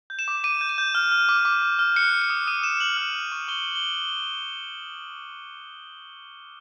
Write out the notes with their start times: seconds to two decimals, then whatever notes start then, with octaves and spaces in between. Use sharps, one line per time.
0.10 G6
0.19 E7
0.28 D6
0.44 D6 D#7
0.61 G6
0.69 D#7
0.78 G6
0.95 F6
1.12 F6
1.29 D6
1.45 D6
1.62 F6
1.79 F6
1.96 F#6 C#7
2.13 F#6
2.22 C#7
2.30 D#6
2.47 D#6 D#7
2.63 F#6 E7
2.80 F#6 F#7
2.97 F6
3.15 F6
3.32 C#6
3.48 C#6 G7
3.65 F6
3.76 G7